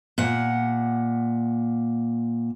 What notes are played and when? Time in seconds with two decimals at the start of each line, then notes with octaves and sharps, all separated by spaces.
0.18 A#2 F#5